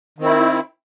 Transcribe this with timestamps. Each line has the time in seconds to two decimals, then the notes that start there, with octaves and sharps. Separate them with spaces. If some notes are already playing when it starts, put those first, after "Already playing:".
0.18 D#3
0.21 C4
0.24 E4